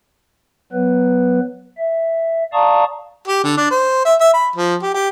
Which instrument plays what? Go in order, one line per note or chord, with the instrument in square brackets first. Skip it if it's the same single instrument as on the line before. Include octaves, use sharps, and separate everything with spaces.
[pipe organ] F#3 B3 B4
E5
D5 F5 A5 A#5 C#6 D#6
[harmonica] G4
D3
D4
C5
E5
E5
B5
F3
G4
G4